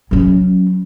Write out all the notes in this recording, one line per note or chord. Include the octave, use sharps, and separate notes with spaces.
F#3 C#4